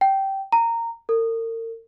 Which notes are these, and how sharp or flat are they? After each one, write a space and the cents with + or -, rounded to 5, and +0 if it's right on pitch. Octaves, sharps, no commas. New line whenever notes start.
G5 -15
A#5 -15
A#4 -40